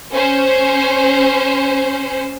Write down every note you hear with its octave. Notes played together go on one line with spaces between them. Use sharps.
C#4 C5